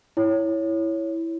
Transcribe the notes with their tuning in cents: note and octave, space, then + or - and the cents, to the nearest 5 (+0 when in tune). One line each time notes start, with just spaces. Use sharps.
E4 +0 C#5 +0